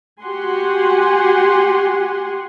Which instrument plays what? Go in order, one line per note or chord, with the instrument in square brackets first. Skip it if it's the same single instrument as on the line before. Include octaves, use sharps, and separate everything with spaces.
[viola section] F#4 G4 F#5 G#5 C6